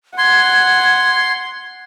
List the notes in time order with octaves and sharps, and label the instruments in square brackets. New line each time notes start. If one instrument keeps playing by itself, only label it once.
[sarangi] F#5 [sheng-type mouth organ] C6 [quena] G#6